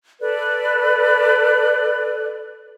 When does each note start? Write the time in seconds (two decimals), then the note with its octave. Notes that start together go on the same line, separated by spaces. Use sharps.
0.21 A4 B4 D5